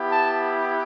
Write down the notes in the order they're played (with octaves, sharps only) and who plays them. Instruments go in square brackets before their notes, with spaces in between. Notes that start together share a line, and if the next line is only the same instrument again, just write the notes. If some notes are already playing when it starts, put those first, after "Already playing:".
Already playing: [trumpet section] B3 E4 G4
A5